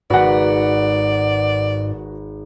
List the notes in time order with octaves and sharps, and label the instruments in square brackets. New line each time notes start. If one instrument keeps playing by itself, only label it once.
[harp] G#1 B4 [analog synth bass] G#2 [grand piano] F#4 F#5 [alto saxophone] D5